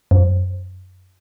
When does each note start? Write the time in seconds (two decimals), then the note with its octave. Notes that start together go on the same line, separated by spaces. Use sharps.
0.11 F#2